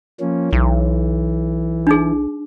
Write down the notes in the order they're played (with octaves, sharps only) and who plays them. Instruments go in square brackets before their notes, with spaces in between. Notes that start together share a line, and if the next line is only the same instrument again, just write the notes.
[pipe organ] F3 A#3 C#4
[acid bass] B1 [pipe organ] E3
[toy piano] D4 D#4 G#4